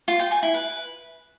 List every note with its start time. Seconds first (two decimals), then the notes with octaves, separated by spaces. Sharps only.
0.08 F4
0.19 G5
0.31 G#5
0.43 E4
0.54 B4